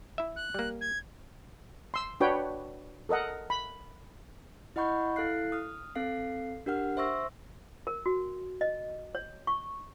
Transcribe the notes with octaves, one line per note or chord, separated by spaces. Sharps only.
E4 E5
F#6
G3 A#3
G#6
C6 E6
D4 F#4 B4 C#5 G5
A4 A#4 D#5 F#5
B5
E4 D#5 F#5 B5 C#6 G6
E4 A4 F5 F#6 C7
D#6 F6
C4 A4 F5 C7
D4 G4 A#4 F#5 F6
C5 E5 C6 C#6 E6 A#6
A#4
F#4
D#5
C#5
C#6